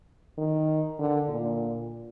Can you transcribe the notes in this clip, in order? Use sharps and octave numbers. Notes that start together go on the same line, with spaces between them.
D#3
D3
A#2